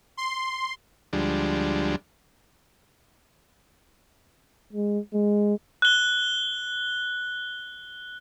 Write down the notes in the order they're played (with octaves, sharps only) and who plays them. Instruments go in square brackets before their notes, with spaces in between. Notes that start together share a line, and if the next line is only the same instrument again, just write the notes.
[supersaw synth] C6
[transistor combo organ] D2 F3 G3 G#3 D4
[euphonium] G#3
G#3
[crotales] F#6 G7